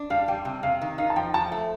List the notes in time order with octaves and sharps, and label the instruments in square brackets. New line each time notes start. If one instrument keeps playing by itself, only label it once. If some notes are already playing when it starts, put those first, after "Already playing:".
Already playing: [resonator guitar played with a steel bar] D4
[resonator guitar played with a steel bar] G3 [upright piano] F5
[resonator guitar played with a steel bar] G3 [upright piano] G5
[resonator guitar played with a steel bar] C3
[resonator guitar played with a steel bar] C3 [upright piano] F5
[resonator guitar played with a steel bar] D#3
[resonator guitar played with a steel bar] D#4 [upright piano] F5
[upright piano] A5
[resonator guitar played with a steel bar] F3 [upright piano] G5
[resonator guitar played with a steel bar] F3 [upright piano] A5
[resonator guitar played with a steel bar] A3